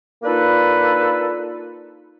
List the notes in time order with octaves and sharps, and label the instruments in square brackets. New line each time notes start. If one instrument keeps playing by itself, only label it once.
[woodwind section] A#3 D4 D#4 F4 A4 B4